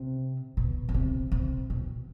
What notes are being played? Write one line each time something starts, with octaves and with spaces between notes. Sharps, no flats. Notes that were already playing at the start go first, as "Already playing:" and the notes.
Already playing: C3
B2
C#3
C3
C3
B2